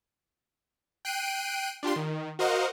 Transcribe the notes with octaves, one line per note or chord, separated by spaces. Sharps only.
G5 F#6 C7 D7 D#7
D4 F4 G4 C6
D#3
F#4 A#4 C5 D#5 F5 F#5